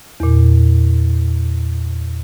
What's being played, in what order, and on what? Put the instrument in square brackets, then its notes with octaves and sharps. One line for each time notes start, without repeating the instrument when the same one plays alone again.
[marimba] E2 A#2